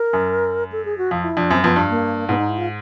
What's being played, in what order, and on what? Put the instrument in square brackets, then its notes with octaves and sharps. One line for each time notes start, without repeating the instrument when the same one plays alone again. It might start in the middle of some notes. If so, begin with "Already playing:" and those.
Already playing: [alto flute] A#4
[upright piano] F#2
[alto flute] A4
G#4
F#4
[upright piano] F2 [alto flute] F4
[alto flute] E4
[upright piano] F2 [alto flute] D4
[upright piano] F#2 [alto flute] C4
[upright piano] F2 [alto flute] B3
[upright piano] G2
[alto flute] A#3
[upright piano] G#2 [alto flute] B3
[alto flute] D#4
E4
F4